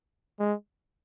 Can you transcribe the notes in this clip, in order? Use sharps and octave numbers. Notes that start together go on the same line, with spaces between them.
G#3